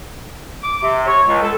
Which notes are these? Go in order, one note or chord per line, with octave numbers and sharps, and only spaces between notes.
D6
C3
C#5
C#2
A4